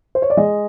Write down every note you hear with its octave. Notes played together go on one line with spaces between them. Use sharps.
C5
C#5
D5
G#3 D#5